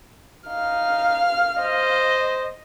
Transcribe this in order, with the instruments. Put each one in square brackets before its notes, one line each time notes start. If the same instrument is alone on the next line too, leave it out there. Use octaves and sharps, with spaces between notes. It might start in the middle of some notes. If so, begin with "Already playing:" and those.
[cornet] D#4 [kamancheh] F5 F6
[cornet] C5 [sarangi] D#5